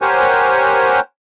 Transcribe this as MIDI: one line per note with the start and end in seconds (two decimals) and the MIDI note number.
0.02 1.00 67
0.02 1.00 70
0.02 1.00 72
0.02 1.00 73
0.02 1.00 78
0.02 1.00 80